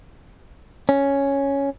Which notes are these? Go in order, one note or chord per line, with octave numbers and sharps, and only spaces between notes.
C#4